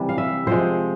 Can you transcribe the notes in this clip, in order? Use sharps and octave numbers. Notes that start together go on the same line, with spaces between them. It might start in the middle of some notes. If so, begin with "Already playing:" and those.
Already playing: C3 E3 G3
F5
E5
C3 F3 G#3 C5